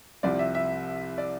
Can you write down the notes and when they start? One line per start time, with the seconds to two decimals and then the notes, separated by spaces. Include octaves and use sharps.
0.23 C2 C3 F3 D5
0.39 E5
0.55 E5
1.18 D5